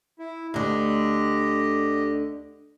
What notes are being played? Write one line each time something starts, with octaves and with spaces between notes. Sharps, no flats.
E4
D2 D3 G4 D#5